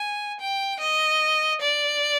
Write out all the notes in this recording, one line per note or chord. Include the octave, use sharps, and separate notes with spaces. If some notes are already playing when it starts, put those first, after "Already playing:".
Already playing: G#5
G5
D#5
D5